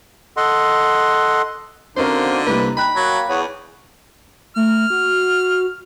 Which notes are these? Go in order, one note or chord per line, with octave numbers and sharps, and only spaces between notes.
A4 D#5 F#5 C6
D3 A#3 C4 C#4 D#4 F#4 A#4 C5
C2 G3 A#3 D#4 B4
G5 A#5 B5 F#6
F#3 A#3
E2 G#4 C#5 F#5
A3 F6
F#4